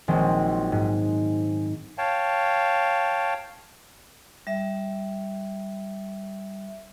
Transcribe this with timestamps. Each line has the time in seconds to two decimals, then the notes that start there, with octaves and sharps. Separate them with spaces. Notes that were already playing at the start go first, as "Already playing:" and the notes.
0.08 A#1 D#3 F#3 G#3 C4 G5
0.72 G#2
1.98 C#5 F5 G5 A5
4.47 G3 E5